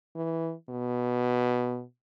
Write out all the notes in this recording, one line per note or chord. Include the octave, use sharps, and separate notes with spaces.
E3
B2